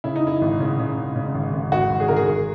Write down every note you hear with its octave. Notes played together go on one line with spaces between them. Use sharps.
C#3 E4
D#4
F#2 E4
G#1
C#3
C#3
C#3
C#3
G#1
G#1
G#1 F#4
G#1
G#4
G#1 A#4
G#4
G#1